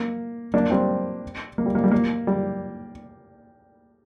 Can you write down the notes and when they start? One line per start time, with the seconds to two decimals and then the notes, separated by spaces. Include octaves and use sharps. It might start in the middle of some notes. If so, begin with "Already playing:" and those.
Already playing: A#3
0.54 A#3 D4
0.71 G3 C4
1.58 A#3
1.66 G3
1.75 A#3
1.84 G3
1.92 A#3
2.27 G3